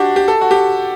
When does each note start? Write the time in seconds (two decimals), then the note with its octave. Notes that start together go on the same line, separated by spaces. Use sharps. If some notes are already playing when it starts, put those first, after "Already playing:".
Already playing: D4 F#4 G4
0.16 G4
0.28 A4
0.41 F#4
0.51 G4